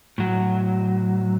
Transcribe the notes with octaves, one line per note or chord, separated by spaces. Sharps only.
A2 F#3